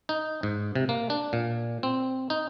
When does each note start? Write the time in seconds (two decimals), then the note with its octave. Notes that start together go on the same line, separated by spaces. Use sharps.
0.09 D#4
0.43 G#2
0.75 C3
0.89 A#3
1.10 D4
1.33 A#2
1.83 C4
2.30 D#4